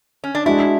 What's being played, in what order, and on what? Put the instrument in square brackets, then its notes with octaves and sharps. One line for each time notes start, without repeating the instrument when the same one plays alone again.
[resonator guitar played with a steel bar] C#4
D4
[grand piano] G#3 D4 F#4 [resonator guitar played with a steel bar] E4